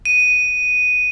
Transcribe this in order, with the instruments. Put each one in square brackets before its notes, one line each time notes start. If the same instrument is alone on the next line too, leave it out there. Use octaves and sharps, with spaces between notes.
[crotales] D#7